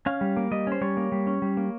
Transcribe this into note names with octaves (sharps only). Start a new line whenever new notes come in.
C#4 F5
G3
A#3
G3 D#5
C#4 C5
G3 C#5
A#3
G3
C#4
G3
A#3